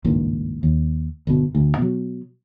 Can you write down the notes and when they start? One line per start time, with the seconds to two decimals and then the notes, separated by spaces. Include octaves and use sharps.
0.04 G#1 C#2 G2 A#2
0.63 D#2
1.27 G1 B2
1.55 D2
1.77 B2 F#3